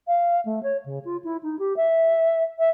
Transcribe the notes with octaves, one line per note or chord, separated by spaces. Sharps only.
F5
A3
C#5
C#3
F4
E4
D#4
G4
E5
E5